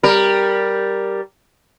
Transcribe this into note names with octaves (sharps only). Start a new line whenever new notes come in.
G3 A#4